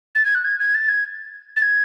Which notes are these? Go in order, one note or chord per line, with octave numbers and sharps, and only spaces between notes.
A6
G#6
F#6
G#6
G#6
A6
G#6
A6
G#6